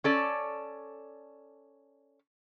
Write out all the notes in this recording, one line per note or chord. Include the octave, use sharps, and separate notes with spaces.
C#4 A4 D5